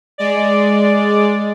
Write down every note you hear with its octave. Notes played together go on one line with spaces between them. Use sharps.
G#3 D5